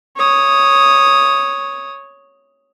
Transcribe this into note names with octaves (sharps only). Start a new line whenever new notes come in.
C#5 D#6